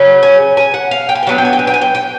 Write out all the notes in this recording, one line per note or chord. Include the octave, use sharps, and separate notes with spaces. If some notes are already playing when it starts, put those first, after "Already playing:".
Already playing: C#3 F#3 C#4
G#5
G#5
F#5
F5
G5
G#5
G5
D#3 F#3 B3 D4 G#5
G5
G#5
G5
G#5
G5
G#5
G5
G5